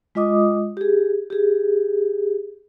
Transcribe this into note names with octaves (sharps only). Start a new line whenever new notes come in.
G#3 F4 D#5 D6 D#6
G4 G#4
G4 G#4